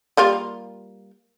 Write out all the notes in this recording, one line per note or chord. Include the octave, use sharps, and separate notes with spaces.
G3 A#3 F4